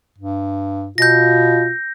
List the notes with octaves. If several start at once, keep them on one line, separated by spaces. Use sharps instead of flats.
G2
B2 F4 G6 A#6